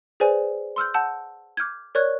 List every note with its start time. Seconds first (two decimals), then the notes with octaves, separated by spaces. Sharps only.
0.20 G#4 B4 C5 D5 G#5
0.76 C6 E6 F6 G6
0.94 F#5 A5 E6 G6
1.57 D6 F6 G6 G#6
1.95 A#4 C#5 D5 C#6 F#6 G#6